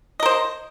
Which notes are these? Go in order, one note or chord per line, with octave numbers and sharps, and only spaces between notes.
A#4 C5 D#5